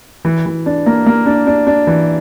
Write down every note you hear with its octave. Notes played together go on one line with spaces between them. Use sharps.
E3
E3
D4
A#3
A#3
D4
D4
D4
E3